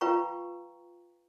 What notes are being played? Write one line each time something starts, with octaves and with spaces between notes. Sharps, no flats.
F4 B4 F5 G5 A#5 C#6